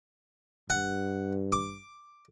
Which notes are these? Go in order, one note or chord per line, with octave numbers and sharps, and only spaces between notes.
G2 F#5
D6